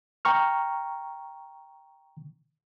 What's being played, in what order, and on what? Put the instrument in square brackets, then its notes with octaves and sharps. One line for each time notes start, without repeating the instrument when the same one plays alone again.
[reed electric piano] G5 A#5 C#6 F6